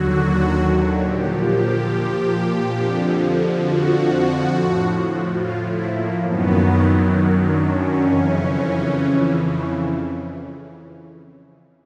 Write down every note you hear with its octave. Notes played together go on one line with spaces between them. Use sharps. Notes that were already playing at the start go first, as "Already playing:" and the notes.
Already playing: D#2 D3 F#3 F#4
A#2 F3 G4
G4
F2 D3 F3
F#4
A2 F3
F4
E4
A#3
F#2 D#3 F#3 B3
D4
C#4
F2 C#3 E3